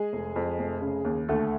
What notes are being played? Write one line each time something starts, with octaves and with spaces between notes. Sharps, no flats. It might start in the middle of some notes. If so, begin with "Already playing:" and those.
Already playing: G#3 G#4
F1
F2
F1
C#3
D#2
D2 A3 A4